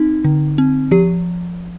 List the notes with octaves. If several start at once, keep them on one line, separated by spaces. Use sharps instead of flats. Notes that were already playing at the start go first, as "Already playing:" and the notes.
Already playing: C4 D#4
D3
C4
F3 G4